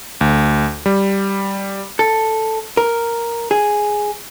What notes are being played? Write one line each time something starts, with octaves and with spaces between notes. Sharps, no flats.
D2
G3
A4
A#4
G#4